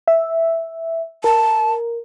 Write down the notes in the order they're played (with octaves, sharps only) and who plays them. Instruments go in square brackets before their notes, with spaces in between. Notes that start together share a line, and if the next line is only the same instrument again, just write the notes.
[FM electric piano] E5
[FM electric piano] A#4 [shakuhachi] A5